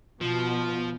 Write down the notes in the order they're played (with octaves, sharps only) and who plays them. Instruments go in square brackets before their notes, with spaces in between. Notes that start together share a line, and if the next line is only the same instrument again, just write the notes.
[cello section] B2 [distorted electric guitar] F3